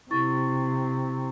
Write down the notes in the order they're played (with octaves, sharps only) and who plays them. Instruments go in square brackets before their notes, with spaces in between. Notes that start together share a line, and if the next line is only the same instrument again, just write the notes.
[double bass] C3 [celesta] E4 C#6 A6